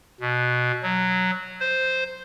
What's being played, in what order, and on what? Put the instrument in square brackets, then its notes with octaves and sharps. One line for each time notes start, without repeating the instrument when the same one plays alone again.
[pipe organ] B2
F#3
C5